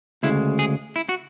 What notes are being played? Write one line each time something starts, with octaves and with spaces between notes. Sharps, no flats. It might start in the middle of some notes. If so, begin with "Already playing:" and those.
D2 C#3 G#3 E4
G#4
E4
F#4